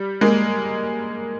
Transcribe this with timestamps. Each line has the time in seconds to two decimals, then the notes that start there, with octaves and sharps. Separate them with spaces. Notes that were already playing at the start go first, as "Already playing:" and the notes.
Already playing: G3
0.21 G#3 A#3